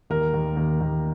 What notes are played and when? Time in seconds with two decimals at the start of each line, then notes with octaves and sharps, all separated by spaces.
0.10 D#2 A#4
0.33 D#2
0.57 D#2
0.81 D#2